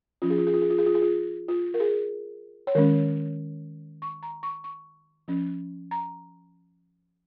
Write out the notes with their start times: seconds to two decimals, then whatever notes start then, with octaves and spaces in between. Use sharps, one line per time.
0.22 F3 C#4 F4
0.30 G#4
0.38 F4
0.47 G#4
0.54 F4
0.62 G#4
0.70 F4
0.78 G#4
0.86 F4
0.95 G#4
1.02 F4
1.48 F4
1.74 A#4
1.80 G#4
2.67 C#5
2.75 D#3 G#3 C#4 A#4
4.02 C#6
4.23 A#5
4.43 C#6
4.64 C#6
5.28 F3 C#4
5.91 A#5